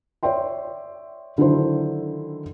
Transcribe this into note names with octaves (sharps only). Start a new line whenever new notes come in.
C#5 D5 E5 G5 C6
D3 D#3 F#3 D4 E4 C5